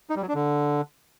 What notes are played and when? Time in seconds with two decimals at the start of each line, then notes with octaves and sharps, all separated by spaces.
0.10 D#4
0.16 G3
0.22 F#3
0.28 D4
0.35 D3